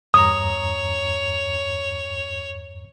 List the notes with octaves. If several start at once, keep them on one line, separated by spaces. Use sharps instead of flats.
E2 G2 C#5 A#5 D#6